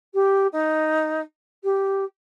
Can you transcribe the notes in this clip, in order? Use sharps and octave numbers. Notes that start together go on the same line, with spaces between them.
G4
D#4
G4